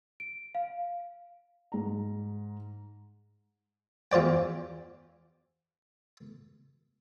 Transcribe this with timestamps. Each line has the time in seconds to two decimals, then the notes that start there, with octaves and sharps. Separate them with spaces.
0.20 D7
0.55 F5
1.72 G#2 A#5
4.12 E2 F4 C5 D5 G5